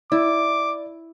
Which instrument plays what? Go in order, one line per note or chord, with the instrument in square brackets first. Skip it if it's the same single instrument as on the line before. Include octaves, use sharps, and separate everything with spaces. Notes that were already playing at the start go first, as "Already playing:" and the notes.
[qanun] E4 [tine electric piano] D5 [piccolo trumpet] D6